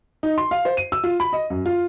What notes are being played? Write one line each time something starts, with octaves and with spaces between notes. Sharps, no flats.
D#4
C6
F5
C5
D#7
E6
F4
B5
D#5
F#2
F4